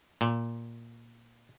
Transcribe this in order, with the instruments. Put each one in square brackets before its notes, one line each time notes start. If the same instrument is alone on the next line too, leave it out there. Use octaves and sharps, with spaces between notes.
[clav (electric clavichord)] A#2